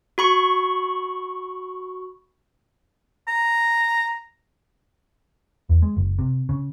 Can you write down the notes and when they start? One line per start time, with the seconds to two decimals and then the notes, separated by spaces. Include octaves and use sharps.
0.18 F#4 B5 C#6
3.28 A#5
5.69 E2
5.82 G#3
5.97 F#1
6.19 C3
6.49 C#3